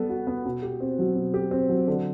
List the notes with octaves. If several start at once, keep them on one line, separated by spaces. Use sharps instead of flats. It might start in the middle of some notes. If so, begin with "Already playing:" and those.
Already playing: G3 B3 A4
F#4
B3
B2
G4
C4
F#3
B2
G4
C4
F#3
D3